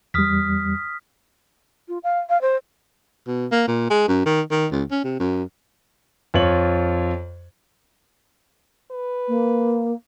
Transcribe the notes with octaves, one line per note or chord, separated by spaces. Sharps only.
E2 G3 D#6 F6 B6
F4
F5
F5
C5
B2
A#3
A#2
G#3
F#2
D#3
D#3
C#2
C#4
C3
F#2
F2 F4 C#5 F#7
B4
A#3